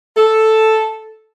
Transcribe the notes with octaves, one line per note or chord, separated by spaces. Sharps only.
A4